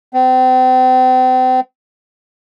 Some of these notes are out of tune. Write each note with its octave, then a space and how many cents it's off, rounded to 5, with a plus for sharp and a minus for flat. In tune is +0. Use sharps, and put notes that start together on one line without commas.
C4 -35